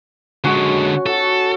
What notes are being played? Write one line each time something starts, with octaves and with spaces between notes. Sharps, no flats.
D3 G#3 C#4 F#4 C#5
F#4 A4